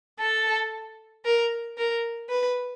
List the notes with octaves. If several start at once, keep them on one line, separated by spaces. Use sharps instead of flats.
A4
A#4
A#4
B4